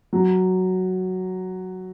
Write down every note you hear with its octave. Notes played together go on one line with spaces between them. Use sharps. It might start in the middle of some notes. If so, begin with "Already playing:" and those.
F#3